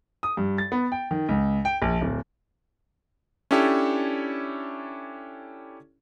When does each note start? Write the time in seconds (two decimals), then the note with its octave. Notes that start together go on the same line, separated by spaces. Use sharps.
0.23 D#6
0.37 G2
0.58 A6
0.72 B3
0.92 G5
1.11 D#3
1.29 C#2
1.65 G5
1.82 A#1
2.01 D1
3.51 C#4 D4 E4 G4 A4 C#5